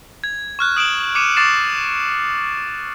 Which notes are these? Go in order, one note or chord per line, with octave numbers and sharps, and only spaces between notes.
G#6
C#6 F6 F#6
D#6 D7 E7 F#7
D6 C#7 D#7 E7
C#6 D6 A6 C7 E7